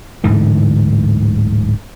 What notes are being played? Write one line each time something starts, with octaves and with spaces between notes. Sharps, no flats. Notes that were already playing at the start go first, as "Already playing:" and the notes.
D1 G#2 D3 E3